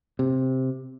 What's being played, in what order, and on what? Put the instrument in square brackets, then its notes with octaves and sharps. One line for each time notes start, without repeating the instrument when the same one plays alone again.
[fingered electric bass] C3